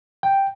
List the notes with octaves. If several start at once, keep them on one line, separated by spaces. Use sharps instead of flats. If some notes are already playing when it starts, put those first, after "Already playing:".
G5